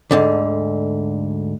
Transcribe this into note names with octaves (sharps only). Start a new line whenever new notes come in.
D2 G#2 D3